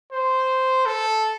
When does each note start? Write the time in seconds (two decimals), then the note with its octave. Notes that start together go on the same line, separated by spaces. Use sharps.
0.12 C5
0.86 A4